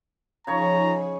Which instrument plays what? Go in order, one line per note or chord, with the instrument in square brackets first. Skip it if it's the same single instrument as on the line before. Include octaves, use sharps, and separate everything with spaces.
[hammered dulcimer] C#3 C#5 C#6 [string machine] F3 D#4 G#4 [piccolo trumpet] A#5